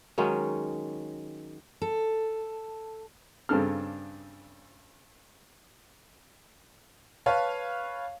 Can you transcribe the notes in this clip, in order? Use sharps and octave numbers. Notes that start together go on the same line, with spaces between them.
D#3 F#3 G#3 C#4
A4
G2 C#3 C4 D4 A4 F6
B4 C#5 F5 A5